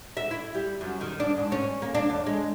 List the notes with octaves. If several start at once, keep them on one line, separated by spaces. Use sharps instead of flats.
E5
E4
G3
F#2
D#3
D4
G#2
C#4
A#3
D4
E2
G#3